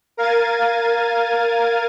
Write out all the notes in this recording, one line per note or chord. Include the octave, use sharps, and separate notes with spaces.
A#4 F5 G#6 A6 D#7